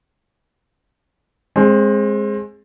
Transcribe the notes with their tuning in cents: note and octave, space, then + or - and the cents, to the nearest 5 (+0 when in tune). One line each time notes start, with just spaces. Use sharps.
G#3 +0 C4 +25